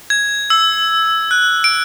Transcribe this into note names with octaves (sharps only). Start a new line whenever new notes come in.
G#6
E6
F#6
D7